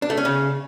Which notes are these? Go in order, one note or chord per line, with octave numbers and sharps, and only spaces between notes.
D4
A3
C#4
C#3